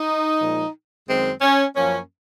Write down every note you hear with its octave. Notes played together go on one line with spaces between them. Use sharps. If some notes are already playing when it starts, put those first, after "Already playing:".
Already playing: D#4
A#2 F3 G#3
F#2 D#3 G#3 C4
C#4
F#2 F3 A#3 C#4